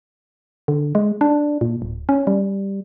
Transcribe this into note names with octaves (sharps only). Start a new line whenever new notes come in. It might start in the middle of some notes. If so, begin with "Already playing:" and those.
D3
G#3
D4
A#2
D1
C#4
G3